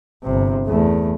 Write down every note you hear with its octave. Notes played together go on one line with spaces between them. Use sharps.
G1 C3
E2 A3